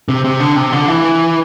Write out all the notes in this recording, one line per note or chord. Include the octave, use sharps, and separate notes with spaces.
C3
C3
D3
C3
D3
E3